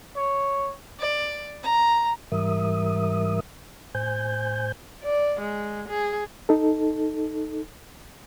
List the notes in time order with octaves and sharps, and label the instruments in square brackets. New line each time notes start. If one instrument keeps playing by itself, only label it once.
[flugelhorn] C#5
[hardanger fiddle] D5
A#5
[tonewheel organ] G#2 E3 G3 A#4 E5 D#6
A2 C5 G#5 G6
[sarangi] D5
G#3
G#4
[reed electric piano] D#4 A4